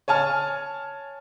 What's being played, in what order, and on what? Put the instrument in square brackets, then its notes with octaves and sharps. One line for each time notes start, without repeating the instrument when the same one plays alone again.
[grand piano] C#5 G#5 A5 F6